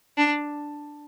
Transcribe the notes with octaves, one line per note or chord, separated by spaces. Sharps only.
D4